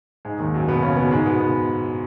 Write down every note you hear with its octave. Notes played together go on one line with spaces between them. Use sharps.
G#2 G#3
D#2 D#3
F#2 F#3
B2 B3
C#3 C#4
B2 B3
G#2 G#3
B2 B3
B2 B3